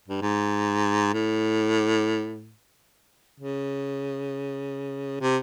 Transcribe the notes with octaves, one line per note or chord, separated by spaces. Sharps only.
G2
G#2
A2
C#3
C3